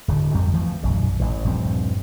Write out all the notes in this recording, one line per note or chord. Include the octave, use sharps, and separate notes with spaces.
D1 G2 D3
F2 G3 C4
E3 F3 A3
D#1 B1 F#2 F#3
A1 E3
D#1 G2 F3 C4